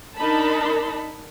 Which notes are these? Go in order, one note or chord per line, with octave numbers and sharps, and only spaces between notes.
D4 D#4 A#4 A5 B5